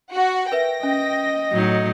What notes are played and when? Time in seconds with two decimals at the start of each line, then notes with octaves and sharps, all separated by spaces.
0.13 F#4 F#5
0.52 A#4 B4 E5 G5 A#6
0.83 C#4 D#5
1.52 A2 F#3 D#4